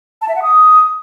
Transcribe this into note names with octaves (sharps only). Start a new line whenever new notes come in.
A5
E5
F#5
D#6